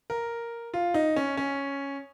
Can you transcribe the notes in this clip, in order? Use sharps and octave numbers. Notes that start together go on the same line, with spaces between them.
A#4
F4
D#4
C#4
C#4